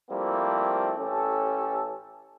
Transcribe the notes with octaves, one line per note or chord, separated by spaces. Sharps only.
F3 G3 A3 A#3 C4 E4
A1 C#4 G4 A4